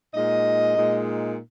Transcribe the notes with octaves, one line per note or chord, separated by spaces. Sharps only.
A#2 G#3 D#4 D#5
A#2 G#3 D#4